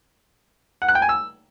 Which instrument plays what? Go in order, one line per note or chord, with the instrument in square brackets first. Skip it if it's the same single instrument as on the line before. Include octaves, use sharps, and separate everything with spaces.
[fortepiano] F#5
F#6
G5
G#5
E6